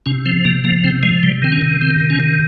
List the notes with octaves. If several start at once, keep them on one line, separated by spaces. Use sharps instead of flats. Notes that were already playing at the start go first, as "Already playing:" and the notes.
C3 C#4
F3 C4
C3 A#3
F3 A#3
C3 C4
F3 G#3
C3 G3
D#3 C4
C#4
C3
D#3 C4
C3
C#4
D#3